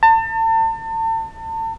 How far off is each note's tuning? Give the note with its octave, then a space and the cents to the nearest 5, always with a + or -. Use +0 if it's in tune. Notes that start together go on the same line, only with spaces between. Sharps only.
A5 +35